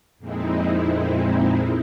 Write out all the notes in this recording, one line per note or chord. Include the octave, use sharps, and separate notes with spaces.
F2 A#2 G#3 C4 D#4 E4